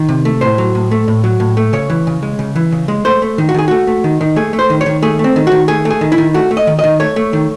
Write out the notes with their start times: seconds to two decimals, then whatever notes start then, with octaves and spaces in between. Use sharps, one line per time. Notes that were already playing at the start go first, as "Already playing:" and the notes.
Already playing: D#3
0.09 C3
0.25 A3
0.41 A2 C5
0.58 F#3
0.75 A2
0.91 A3
1.08 A2
1.24 F#3
1.40 A2
1.57 A3
1.73 C#3 C#5
1.90 E3
2.07 C#3
2.23 G#3
2.39 C#3
2.56 E3
2.72 C#3
2.88 G#3
3.05 A3 C5
3.22 A3
3.38 D#3
3.49 F#4
3.54 D#3 G#4
3.68 A3 F#4
3.87 A3
4.04 D#3
4.21 D#3
4.36 A3 G#4
4.53 A3
4.59 C5
4.70 D#3
4.81 C#5
4.86 D#3
5.02 A3 G#4
5.19 A3
5.24 C4
5.36 D#3
5.47 D#3 F#4
5.68 A3 G#4
5.85 A3
5.90 G#4
6.01 D#3
6.12 E4
6.18 D#3
6.34 A3 F#4
6.51 A3
6.57 D#5
6.67 D#3
6.79 D#3 D#5
7.00 A3 C#5
7.16 A3
7.33 D#3